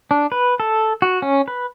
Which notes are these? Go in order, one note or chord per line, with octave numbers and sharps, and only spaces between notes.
D4
B4
A4
F#4
C#4
B4